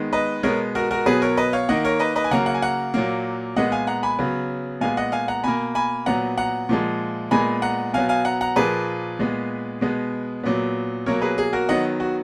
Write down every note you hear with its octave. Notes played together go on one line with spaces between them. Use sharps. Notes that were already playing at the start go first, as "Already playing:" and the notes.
Already playing: D#3 G#3 B3
B4 D#5
B2 G#3 B3 A#4 C#5
F#4 A#4
F#4 A#4
B2 F#3 B3 G#4 B4
A#4 C#5
B4 D#5
C#5 F5
D#3 A#3 D#5 F#5
A#4 C#5
B4 D#5
B4 D#5
G#5
C#3 F#3 A#3 F#5 A#5
F#5
G#5
F#5 A#5
A#2 F#3 A#3
A#2 G#3 B3 D#5 F#5
F5 G#5
F#5 A#5
G#5 B5
C#3 F#3 B3
A#2 G#3 B3 F5 G#5
D#5 F#5
F5 G#5
F#5 A#5
B2 A#3 G#5 B5
G#5 B5
A#2 F#3 B3 F#5 A#5
F#5 A#5
A#2 F3 G#3
A#2 G#3 B3 G#5 B5
F#5 A#5
B2 F#3 B3 F5 G#5
F5 G#5
F#5 A#5
F#5 A#5
A#2 F3 A#3 G#4 B4
A#2 G#3 B3
B2 G#3 B3
A#2 F#3 B3
B2 F#3 A#3 A#4 C#5
G#4 B4
G#4
F#4 A#4
D#3 F#3 B3 D#5 F#5
F#4